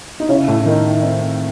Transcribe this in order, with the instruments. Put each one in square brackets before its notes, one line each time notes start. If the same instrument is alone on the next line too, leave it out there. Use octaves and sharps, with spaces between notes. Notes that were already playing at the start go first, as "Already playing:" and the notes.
[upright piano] D#4
[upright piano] C#3 C#4 [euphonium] E4
[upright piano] A2 A3
[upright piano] D#3 [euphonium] D#4
[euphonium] C4